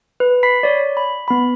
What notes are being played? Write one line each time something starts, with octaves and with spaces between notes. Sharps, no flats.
B4
B5 B6 C7
C#5 D5
B5
B3 B5